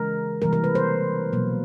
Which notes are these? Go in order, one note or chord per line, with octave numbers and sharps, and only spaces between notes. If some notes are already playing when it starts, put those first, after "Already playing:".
Already playing: C#3 E3 G#3 A#4
C3 E3 G3 A#3 A#4
A#4
B4
C5
B2 F#3 A#3